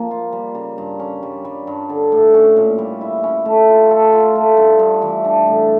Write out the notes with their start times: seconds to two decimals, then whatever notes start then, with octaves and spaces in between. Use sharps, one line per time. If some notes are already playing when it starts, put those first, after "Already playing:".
Already playing: F3 A#3
0.11 F4
0.32 G3
0.55 C#3
0.78 G2
0.99 C#4
1.23 G3
1.45 G3
1.67 G2
1.89 D3
2.12 A2
2.34 C#4
2.57 A#2
2.78 G3
3.01 E4
3.24 C#4
3.45 A3
3.68 F4
3.91 A4
4.12 F4
4.35 A3
4.57 G2
4.79 G2
5.02 E3
5.25 D4
5.47 A2